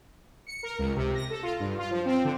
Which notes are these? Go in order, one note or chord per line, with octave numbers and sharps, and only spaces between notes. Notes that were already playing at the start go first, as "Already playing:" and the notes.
C#7
A#4
C#2
C3
A#6
A4
F4
G2
F4
F3
C4
D3